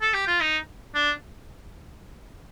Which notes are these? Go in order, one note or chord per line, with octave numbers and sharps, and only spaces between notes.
A4
G4
F4
D#4
D4